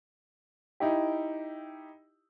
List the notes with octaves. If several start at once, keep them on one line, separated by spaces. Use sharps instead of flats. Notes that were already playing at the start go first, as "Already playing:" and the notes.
D#4 E4 G4